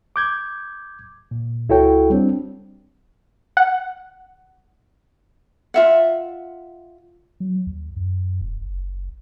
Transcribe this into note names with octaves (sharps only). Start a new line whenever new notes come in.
D6 G6 G#6
A#2
C#2 E4 F#4 A4 C#5 G5
G3 C4 D4
F#5
F4 E5 F#5
F#3
D#2
F#2
E1
F#1